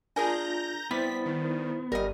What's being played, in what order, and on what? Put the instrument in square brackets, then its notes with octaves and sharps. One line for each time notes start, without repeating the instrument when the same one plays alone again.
[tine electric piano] D4 F4 [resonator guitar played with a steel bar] G#4 A#4 G#5 [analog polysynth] A#5 G6 A#6
[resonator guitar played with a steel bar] G3 [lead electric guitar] B3 [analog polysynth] C4 B6 [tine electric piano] E4 C5 A6
[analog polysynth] D#3
[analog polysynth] G1 [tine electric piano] G3 [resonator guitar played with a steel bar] A#4 D#5